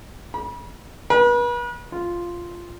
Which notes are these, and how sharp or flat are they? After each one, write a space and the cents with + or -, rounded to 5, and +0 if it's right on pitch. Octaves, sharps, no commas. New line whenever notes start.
B5 -35
B4 -40
F4 -5